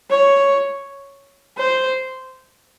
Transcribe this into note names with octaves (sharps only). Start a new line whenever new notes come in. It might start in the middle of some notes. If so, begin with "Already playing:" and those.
C#5
C5